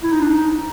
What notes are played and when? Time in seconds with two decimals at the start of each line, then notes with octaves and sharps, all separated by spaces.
0.03 E4
0.12 D#4
0.21 D4
0.30 D#4